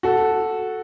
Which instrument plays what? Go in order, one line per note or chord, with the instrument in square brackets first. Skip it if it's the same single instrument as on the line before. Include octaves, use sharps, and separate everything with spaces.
[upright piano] F#4 A4